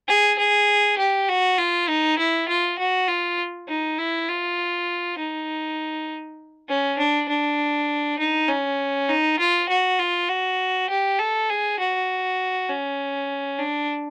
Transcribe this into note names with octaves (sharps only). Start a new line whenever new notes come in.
G#4
G#4
G4
F#4
F4
D#4
E4
F4
F#4
F4
D#4
E4
F4
D#4
C#4
D4
D4
D#4
C#4
D#4
F4
F#4
F4
F#4
G4
A4
G#4
F#4
C#4
D4